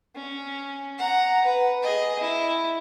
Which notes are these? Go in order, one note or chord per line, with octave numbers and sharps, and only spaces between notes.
C#4
F#5 A#5
B4
G#4 D#5
E4